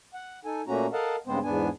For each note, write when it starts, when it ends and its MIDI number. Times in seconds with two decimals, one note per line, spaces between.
0.14 0.40 78
0.45 0.62 63
0.45 0.62 69
0.45 0.62 80
0.67 0.87 46
0.67 0.87 57
0.67 0.87 58
0.67 0.87 61
0.67 0.87 66
0.67 0.87 82
0.93 1.16 69
0.93 1.16 70
0.93 1.16 75
0.93 1.16 77
0.93 1.16 78
0.93 1.16 81
1.27 1.39 43
1.27 1.39 49
1.27 1.39 56
1.27 1.39 59
1.27 1.39 60
1.27 1.39 72
1.43 1.69 40
1.43 1.69 44
1.43 1.69 59
1.43 1.69 62
1.43 1.69 80